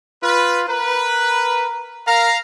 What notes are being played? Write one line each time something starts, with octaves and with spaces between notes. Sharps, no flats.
F4 B4
A#4 B4
A#4 F5 A#5